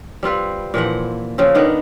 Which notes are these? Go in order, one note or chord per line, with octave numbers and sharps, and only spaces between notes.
G3 C4 F4 B4
A#2 E3 F3 F#5
C#3 F3 C4
D#3 B3 D4 A#4